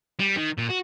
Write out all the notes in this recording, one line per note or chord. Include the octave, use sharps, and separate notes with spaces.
G3
D#3
A#2
F#4